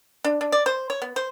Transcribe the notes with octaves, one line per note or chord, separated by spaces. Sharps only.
D4
D4
D5
C5
C#5
B3
C5